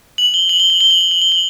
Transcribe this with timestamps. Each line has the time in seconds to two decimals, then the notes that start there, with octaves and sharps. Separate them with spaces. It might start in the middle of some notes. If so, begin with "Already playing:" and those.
0.18 F#7
0.34 G7
0.49 F#7
0.60 G7
0.70 F#7
0.81 G7
0.91 F#7
1.01 G7
1.11 F#7
1.22 G7
1.32 F#7